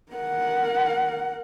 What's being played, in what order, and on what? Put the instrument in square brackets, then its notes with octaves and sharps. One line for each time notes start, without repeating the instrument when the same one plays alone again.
[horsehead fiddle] A#4 F#5